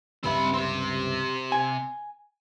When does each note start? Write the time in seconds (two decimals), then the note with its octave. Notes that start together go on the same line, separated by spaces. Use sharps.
0.24 C#2 G2 C4 E5 B5
0.54 C4 G4
1.52 G#5